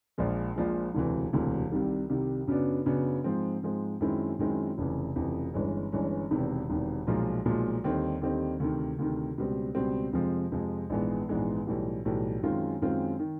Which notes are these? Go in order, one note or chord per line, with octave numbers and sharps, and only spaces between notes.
A#1 A#2 F3 G#3
A#1 A#2 F3 G#3
E1 D2 C3 E3
E1 D2 C3 E3
C2 C3 D#3 G3
C2 C3 D#3 G3
F#2 C#3 F#3 B3 D4
F#2 C#3 F#3 B3 D4
G#2 F3 G#3 C4
G#2 F3 G#3 C4
F#2 D#3 G#3 C4 E4
F#2 D#3 G#3 C4 E4
F1 F2 C#3 E3
F1 F2 C#3 E3
G1 G2 E3 G#3 C#4
G1 G2 E3 G#3 C#4
E1 E2 C3 D#3
E1 E2 C3 D#3
B1 A#2 F3 G#3
B1 A#2 F3 G#3
D#2 D3 G3 C4 D#4
D#2 D3 G3 C4 D#4
D2 C3 D#3
D2 C3 D#3
C#2 B2 G3 C4
C#2 B2 G3 C4
F2 C3 F3 G#3
F2 C3 F3 G#3
A#1 G#2 E3 G#3 B3
A#1 G#2 E3 G#3 B3
B1 A2 E3 G3
B1 A2 E3 G3
F#2 D#3 G#3 C4 F4
F#2 D#3 G#3 C4 F4
D#3